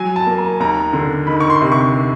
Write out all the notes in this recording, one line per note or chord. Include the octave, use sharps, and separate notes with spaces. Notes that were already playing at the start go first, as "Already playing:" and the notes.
Already playing: F#3 G#5
A5
A#3
A#5
D#2 A#5
D3
D#3 B5
C#6
C6
C3
C#6